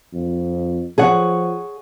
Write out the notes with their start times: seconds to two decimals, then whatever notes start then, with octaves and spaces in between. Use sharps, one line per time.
0.13 F2
0.98 F3 G#4 C#5 F#5